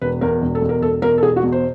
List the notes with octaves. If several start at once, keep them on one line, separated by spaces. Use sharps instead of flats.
E1 B4
E2 B2 A#4
E1
A4
E2 B2
A#4
E1 A4
E2 B2 A#4
A4
E1 G#4
F#4
E2 B2
C5